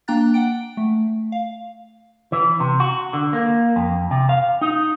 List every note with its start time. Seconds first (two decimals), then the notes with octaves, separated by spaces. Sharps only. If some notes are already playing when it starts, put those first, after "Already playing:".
0.08 A#3 D4 G5 A#5 F#6 A6
0.34 F#5 G5 D7
0.77 A3
1.32 F5
2.32 E3
2.60 C3
2.80 F#4
3.13 D3
3.33 A#3
3.76 F2
4.11 C3
4.29 F5
4.61 D#4